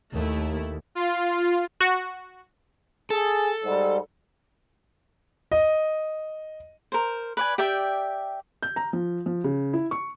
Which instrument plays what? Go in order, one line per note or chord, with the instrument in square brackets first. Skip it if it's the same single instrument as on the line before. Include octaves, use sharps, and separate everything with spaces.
[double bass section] D#2 [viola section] A3 E4
[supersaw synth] F4
[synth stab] F#4
[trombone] G#4 [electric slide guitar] A4
[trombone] G#2 [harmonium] G3
[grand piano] D#5
[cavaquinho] A#4 C5
B4 D5 G#5
G4 D5 E5 G5
[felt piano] G6
A#5
F3
F3
C#3
E4
C#6